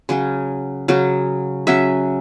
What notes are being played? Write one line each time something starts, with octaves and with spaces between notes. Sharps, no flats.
C#3 F#3 C#4
C#3 F#3 C#4
C#3 F#3 C#4 E5